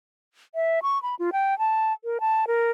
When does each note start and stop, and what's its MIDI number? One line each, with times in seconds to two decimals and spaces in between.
0.55 0.80 76
0.83 1.01 85
1.02 1.15 83
1.19 1.30 65
1.33 1.58 79
1.59 1.93 81
2.04 2.18 70
2.20 2.45 81
2.47 2.71 70